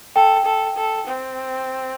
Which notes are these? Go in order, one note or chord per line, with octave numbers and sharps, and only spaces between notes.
A4 G5
A4
A4
C4